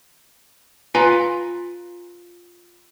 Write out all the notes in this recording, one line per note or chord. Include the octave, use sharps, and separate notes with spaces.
F4 B4 G#5 A#5